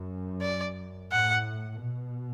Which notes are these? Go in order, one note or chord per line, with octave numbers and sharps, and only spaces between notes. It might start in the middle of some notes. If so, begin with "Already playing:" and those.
Already playing: F#2
D5
A2 F#5
B2